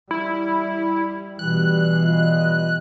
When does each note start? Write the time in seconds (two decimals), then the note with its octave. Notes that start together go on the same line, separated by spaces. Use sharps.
0.11 G3 E4
1.39 B2 E3 G3 F#6
2.04 G3 F4 D#5